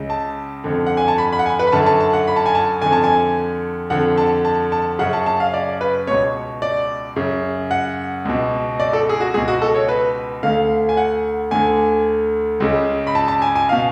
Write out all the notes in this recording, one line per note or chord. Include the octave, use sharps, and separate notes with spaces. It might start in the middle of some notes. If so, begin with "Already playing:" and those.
Already playing: C#2 C#3
A5
F2 D3
F#5
G#5
A5
B5
B5
F#5
G#5
B4
B5
F#2 D3 A5
A5
A5
F#5
B5
A5
G#5
A5
F2 D3 G#5
A5
G#5
F2 D3 F#5
A5
A5
A5
F#2 C#3 F#5
A5
A5
F5
D5
B4
C#2 B2 C#5
D5
F#2 C#3
F#5
C#2 B2
D5
A4
G#4
F#4
C#2 B2 G#4
F#4
A4
C#5
B4
D2 D3 F5
G#5
F#5
D2 D3 G#5
C#2 C#3
B5
A5
A5
G#5
G#5
B2 F5